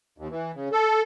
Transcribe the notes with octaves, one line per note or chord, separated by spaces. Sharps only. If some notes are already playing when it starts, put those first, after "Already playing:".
D#2
E3
C#3
A4